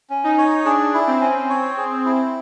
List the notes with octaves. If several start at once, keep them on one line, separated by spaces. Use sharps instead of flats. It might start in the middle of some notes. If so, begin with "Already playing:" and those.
C#4
D#4
C#5
D4 G#4
E4
C4
C#4
C#5
G#4
E4